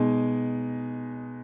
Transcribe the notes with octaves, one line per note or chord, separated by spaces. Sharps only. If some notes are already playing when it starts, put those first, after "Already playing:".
Already playing: B2 G#3 D#4